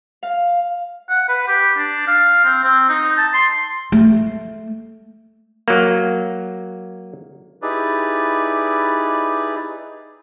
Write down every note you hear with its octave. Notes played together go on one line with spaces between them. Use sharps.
F5
F#5
B4
G4
D4
F5
C4
C4
D#4
A5
C6
A3
F#3 A#3
D#4 E4 G4 G#4 B4 D5